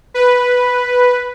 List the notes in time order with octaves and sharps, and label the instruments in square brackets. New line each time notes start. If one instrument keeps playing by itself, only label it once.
[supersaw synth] B4